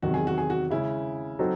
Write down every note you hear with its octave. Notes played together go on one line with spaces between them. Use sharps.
E2 C3 D#3 F#3 F#4
G#4
F#4
G#4
F#4
C#3 G#3 C#4 E4
F#3 C4 D#4 F#4 A4